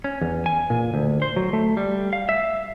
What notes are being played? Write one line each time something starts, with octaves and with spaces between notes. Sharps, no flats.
C#4
E2
G#5
A#2
D2
C5
F#3
A3
G3
F5
E5